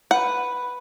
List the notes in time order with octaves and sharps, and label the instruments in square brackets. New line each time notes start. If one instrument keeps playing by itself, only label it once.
[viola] B4 [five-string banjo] F#5